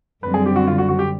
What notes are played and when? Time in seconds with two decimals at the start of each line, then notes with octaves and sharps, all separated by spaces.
0.23 F#2 D3 G3 C4 B4
0.34 G#4
0.46 G4
0.56 F#4
0.67 F4
0.78 F#4
0.89 F#4
0.99 G4